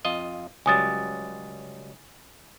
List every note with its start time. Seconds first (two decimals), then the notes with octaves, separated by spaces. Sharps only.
0.05 F2 F4 D#5
0.66 C#2 F#3 G3 G#5 D#6 A6